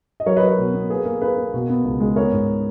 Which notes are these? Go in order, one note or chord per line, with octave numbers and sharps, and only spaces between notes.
D#5
F#3 A#4 C#5
B4 D#5
F#3 A#4 C#5
B2
B3
A#3 G#4 B4
A#3
A#3 G#4 B4
A#3
B2
B3
C#2
G#3
B3 A#4 C#5
G#2